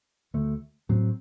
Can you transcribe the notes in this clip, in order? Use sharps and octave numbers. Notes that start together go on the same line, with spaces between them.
D2 D3 A3
A2 F#3 C4